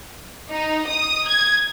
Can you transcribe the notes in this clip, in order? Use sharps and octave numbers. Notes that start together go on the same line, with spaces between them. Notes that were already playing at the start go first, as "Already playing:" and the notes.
D#4
D#6
G#6